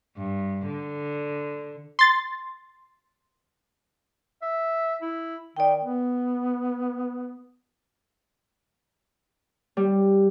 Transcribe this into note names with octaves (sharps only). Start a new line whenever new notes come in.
G2
D3
C6 A6
E5
E4
D#3 D5 G5
B3
G3